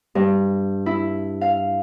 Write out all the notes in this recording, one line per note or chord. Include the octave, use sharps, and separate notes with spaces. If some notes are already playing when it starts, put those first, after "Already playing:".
G2
E4
F5